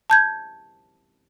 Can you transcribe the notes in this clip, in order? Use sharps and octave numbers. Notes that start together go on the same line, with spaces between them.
A5 G6 G#6